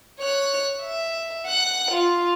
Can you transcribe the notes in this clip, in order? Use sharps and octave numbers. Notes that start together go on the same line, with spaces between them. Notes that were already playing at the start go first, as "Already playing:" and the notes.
C#5 F#6
E5
F#5 F#6
F4